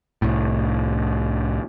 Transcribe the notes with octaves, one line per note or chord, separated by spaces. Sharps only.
C2 A2